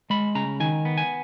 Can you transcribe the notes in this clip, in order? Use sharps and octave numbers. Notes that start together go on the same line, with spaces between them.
G#3 B5
C#3 A#5
D#3 G#5
B3
G#5